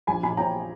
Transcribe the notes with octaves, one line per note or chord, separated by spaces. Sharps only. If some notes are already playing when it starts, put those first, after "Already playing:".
A#1 G#5 B5
A#2 G#5 B5
A#2 G5 A#5